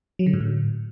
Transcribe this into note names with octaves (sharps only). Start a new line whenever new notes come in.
F#3
D3
G#2
A2